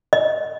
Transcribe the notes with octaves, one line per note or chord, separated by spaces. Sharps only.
D#5